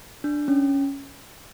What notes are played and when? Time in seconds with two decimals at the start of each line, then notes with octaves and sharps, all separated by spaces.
0.24 D4
0.48 C#4